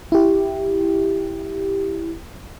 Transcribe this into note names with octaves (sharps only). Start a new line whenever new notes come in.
E4 G4